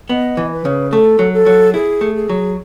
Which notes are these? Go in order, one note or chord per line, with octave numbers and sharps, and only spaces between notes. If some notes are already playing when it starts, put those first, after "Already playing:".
B3 D#5
E3
B4
C#3
A3 A4
F#3
A4
F#3
E4 G#4
A3
G#4
F#3